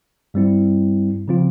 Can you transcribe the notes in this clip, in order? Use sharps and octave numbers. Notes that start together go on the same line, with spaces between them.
G2 G3 C4 E4
C#3 F3 C4 F4